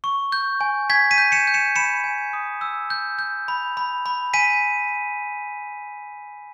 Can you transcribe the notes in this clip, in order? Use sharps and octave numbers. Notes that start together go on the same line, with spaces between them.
C#6
G6
G#5
G#5 G#6 B6
B6 D#7
G6
C#7 E7
G6
C#7 E7
B5 C#7 E7
G#5
D#6
E6
G6
G6
B5
B5
B5
G#5 B6 D#7